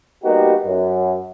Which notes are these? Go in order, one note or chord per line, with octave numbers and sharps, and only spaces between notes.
G3 A#3 B3 D#4 F#4 G4
F#2